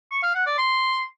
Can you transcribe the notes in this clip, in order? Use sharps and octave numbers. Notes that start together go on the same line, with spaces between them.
C#6
F5
F#5
D5
C6